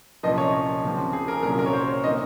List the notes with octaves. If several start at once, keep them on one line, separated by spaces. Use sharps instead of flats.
C2 A#2 F3 A#3 C#4 D#5
C#5
D#2 C#3 F3 C4
G#4
A#4
C2 A#2 F#3 C#4 A#4
A#4
C#5
C5
C#5
C3 D#3 A#3 D#5